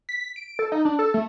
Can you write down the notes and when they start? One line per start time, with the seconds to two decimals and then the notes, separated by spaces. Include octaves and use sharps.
0.09 B6
0.36 D7
0.59 A4
0.72 D#4
0.85 D4
0.99 A4
1.14 A3